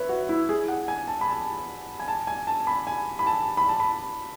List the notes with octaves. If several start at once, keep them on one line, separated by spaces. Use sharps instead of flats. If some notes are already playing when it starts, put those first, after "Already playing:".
Already playing: B4 C#5 E5
F#4
E4
G#4
F#5
G#5
A5
B5
A5
G#5
A5
G#5
A5
B5
G#5
B5
A5
B5
A5
B5